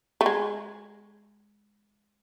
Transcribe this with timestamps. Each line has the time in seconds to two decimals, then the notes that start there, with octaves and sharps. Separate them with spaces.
0.21 A3
0.26 G#3